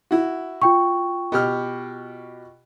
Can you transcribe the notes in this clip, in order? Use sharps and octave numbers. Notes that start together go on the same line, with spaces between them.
E4 F#4
F4 G5 C#6
B2 G4 F6